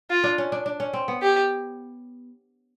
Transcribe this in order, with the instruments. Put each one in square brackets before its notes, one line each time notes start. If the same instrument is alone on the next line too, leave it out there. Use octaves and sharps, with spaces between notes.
[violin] F4
[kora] D4
C#4
D4
D4
C#4
C4
B3
[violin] G4